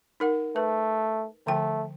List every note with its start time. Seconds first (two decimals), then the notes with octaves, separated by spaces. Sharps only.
0.20 D#4 A#4 F#5
0.56 A3 B4
1.47 D3 F3 A3 G5